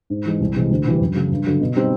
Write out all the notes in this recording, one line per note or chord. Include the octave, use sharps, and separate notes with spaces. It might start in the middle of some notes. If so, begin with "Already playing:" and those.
G#2
E3 G#3
C2
C3 E3 G#3
D2
C3 E3 G3
F#2
C#3 F#3
G2
D3 F#3
B2
G3 C4 D#4